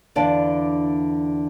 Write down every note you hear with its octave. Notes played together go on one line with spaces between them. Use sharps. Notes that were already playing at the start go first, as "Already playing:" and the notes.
E2 D3 D4 D5 F5